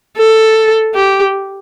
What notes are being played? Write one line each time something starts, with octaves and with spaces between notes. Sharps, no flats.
A4
G4